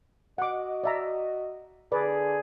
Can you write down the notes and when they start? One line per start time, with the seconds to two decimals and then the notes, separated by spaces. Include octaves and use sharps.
0.38 F#4 D#5 F#5 D6
0.84 D5 E5 A#5
1.92 D3 G#4 B4 D5